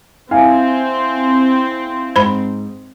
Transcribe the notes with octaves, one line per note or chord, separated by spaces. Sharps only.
C4 E4 F5 G#5
G#2 C5 B5